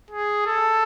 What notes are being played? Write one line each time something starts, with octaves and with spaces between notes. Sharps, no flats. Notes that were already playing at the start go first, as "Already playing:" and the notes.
G#4
A4